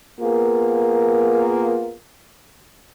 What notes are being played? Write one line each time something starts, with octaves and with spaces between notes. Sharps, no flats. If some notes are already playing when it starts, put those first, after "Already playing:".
A#3 B3 F4 G#4 A#4